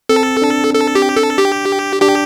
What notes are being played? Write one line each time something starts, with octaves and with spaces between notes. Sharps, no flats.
C4 A4
D4
A4
G4
A4
G4
D4 G4